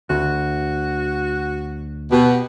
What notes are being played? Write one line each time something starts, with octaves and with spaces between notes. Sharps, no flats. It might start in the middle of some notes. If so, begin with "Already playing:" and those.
D2 F#4
B2 G4